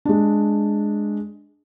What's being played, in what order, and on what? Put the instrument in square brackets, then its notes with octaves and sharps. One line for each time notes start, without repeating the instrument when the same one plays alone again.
[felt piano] G#3 D4